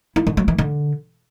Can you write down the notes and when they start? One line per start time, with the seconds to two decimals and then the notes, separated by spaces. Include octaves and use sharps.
0.16 E4
0.27 D3
0.37 F#3
0.48 E3
0.58 D3